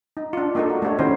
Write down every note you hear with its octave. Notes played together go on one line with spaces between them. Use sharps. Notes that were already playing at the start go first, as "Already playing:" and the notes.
D#4
D4 F4
A#3 D4 D#4 F4 A4
F#4
A3 D4 G4 C#5
D#3 C#4 D#4 E4 F#4 C5